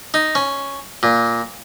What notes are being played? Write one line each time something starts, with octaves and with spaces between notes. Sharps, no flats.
D#4
C#4
A#2